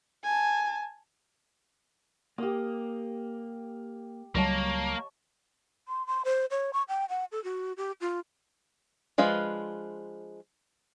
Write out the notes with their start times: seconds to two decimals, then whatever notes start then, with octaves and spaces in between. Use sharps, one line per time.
0.24 G#5 A5
2.38 A#3 G4 D#6
4.35 C#2 F#3 G3 A#3 C#5 D#5 A5
5.88 C6
6.07 C6
6.25 C5
6.51 C#5
6.73 C#6
6.88 G5
7.09 F#5
7.32 A4
7.44 F#4
7.77 G4
8.01 F4
9.18 F3 G#3 D4 F4 B4